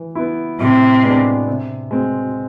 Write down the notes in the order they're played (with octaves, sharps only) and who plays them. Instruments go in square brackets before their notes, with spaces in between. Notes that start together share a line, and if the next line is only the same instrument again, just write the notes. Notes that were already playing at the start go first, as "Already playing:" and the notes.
Already playing: [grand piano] E3
B3 E4
[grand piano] A2 [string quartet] C3
[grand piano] G#3 B3 D4
C3
G#3 C4